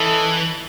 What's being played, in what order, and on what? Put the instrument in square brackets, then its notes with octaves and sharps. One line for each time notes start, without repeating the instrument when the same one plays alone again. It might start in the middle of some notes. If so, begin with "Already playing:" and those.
Already playing: [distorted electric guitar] E3 [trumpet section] C#4 E4 A4 D#5